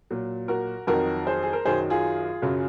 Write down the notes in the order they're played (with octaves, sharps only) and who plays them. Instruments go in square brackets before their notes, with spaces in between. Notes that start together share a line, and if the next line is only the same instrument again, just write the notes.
[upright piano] A#2 F#3
F#4 A#4
F2 D#3 F#3 F#4 A#4
G#4 C5
G#4
A#4
F#2 D#3 F#3 G#4 C5
F4 G#4
F#2 C#3 F#3